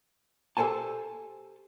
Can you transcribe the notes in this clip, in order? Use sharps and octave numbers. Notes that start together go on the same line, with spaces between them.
G4 A4 A#4 C5 G#5 A5